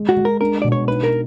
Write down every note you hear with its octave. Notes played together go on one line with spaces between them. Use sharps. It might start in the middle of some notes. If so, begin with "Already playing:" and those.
Already playing: G#3
F#4
G#3
A#4
D4 A#4
B2 D5
C#5
D#4 B4
A#4